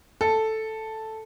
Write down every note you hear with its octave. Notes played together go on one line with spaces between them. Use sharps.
A4